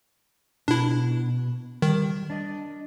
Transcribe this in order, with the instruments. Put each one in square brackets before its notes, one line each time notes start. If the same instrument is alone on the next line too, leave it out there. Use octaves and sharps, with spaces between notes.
[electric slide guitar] B2 [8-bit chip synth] D4 E4
[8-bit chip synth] D#3 [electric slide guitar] G3
[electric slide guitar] D4 D5 D#5